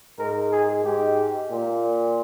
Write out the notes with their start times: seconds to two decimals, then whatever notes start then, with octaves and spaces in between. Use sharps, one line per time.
0.19 G#2 A#4
0.52 G#4
0.85 G#2 G4
1.51 A#2